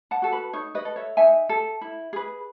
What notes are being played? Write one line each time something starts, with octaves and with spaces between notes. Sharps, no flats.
F#5 A5
F#4 A4
B4
D#4 C#5
B4 D#5
A4
C#5 E5
D#4 E5 G#5
A4
E4
G#4 B4